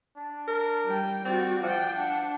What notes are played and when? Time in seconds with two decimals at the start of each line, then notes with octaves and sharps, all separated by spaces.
0.16 D4
0.48 A#4
0.85 G3 G5
1.25 G3 C4 F#4 D5
1.63 F3 D5 F#5 G5
1.95 D4 F#5